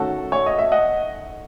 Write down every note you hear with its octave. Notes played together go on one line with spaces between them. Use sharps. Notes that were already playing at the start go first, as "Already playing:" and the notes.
Already playing: D#3 A3 C#4 F#4 A4
C#5
D#5
E5
D#5 F#5